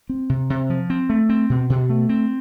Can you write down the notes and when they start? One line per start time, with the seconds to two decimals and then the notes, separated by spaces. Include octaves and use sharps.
0.09 C4
0.29 C3
0.50 C3
0.70 F3
0.90 C4
1.10 A3
1.29 C4
1.50 B2
1.70 B2
1.90 A3
2.09 C4